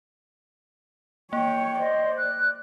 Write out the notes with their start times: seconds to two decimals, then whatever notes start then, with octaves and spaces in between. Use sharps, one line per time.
1.33 A#3 C#5 G5
1.79 C5 D5 D#5
2.16 F#6